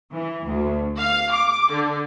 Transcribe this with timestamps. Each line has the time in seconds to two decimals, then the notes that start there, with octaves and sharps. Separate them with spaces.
0.13 E3
0.45 D2
0.97 F5
1.30 D6
1.69 D3